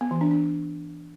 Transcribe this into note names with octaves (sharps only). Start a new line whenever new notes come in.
B3
E3
D4
D4